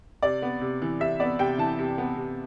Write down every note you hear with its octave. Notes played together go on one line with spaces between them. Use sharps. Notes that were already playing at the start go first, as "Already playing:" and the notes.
C3 D5
B3
C3
E3
C3 E5
B3 D5
C3 G5
E3 A5
C3
B3
C3